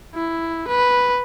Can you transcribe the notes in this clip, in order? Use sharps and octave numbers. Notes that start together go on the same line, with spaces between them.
E4
B4